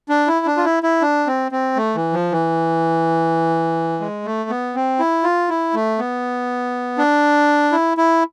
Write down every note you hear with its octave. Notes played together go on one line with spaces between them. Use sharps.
D4
E4
D4
F4
E4
E4
D4
C4
C4
A3
E3
F3
E3
G#3
A3
B3
C4
E4
F4
E4
A3
B3
D4
E4
E4